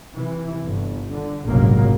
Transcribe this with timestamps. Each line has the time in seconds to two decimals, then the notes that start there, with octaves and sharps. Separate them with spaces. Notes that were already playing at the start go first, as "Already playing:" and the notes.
0.14 C3 E3
0.65 G1
1.12 D3
1.46 F1 A#1 G#2 C#3 F#3 A#3